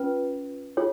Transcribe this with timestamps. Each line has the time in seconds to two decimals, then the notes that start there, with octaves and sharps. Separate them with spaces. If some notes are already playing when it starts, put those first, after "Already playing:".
Already playing: C#4 F4 B4
0.77 F4 G#4 C#5